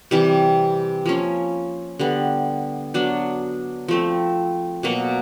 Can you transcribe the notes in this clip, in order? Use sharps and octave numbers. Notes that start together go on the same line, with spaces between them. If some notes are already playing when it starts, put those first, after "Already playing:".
C3 E3 G3
F3 A#3 C#4
D3 G3 B3
F#3 B3 D4
F3 A3 C4
B2 F#3 A#3